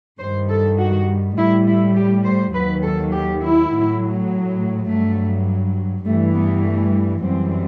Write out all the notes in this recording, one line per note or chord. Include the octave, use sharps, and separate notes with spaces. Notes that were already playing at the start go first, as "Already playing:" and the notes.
G2 D#3 G3 C5
A4
F#4
A2 G3 E4
E4
G4
C5
D#2 D#3 F#3 B4
A4
G4
E4
A2 F#3
G2 F#3 A3
G2 E3 G3 A3
B3
A3
F#2 E3 G3 C4